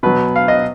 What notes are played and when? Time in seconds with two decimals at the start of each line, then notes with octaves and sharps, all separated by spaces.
0.03 B2 F#3 B4
0.36 F5
0.48 D#5